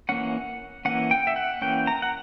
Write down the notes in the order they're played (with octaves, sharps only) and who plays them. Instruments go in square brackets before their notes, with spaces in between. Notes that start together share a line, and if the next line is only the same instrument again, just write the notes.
[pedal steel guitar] E3 A#3 C#4 F#5
E3 A#3 C#4 F#5
G5
E5
F#5
E3 A#3 C#4 G5
A#5
F#5